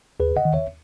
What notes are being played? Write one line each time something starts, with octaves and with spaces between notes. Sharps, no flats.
D#2 G#4 B4
D#5 F#5
D#3
C#5 E5